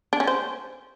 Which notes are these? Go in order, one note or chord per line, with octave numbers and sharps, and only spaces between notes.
D4
C#4
C5